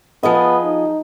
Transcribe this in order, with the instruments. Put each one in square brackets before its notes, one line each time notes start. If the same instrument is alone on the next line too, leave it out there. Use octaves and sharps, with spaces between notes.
[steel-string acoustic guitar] F3 G#4 D#5 [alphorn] B3
[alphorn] D#4